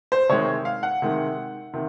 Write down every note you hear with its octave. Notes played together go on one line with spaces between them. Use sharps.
C5
C3 D#3 G#3 C#5
F5
F#5
C3 D#3 G#3
C3 D#3